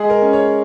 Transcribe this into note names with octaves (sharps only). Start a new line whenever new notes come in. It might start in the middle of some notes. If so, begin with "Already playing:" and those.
Already playing: G#3 G#4
A#4
C#4
C#5